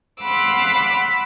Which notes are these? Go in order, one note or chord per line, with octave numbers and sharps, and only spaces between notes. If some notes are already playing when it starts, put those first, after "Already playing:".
F5 F#5 B5 C6 D6 E6